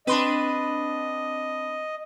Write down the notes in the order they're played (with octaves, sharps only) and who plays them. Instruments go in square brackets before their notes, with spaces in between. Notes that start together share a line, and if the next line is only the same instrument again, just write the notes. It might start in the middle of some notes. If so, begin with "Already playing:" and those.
[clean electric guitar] C4 C6 [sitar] D4 B4 [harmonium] D#5